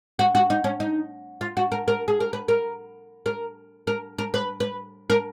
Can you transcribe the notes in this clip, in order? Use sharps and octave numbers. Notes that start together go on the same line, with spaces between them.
F#4
F#4
D#4
C#4
D#4
F4
F#4
A#4
A#4
G#4
A#4
B4
A#4
A#4
A#4
A#4
B4
B4
A#4